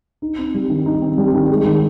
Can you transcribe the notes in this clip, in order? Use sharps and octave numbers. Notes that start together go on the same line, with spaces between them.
D#4
C4
G3
D#3
D#4
C4
G3
D#3
G#3
D#3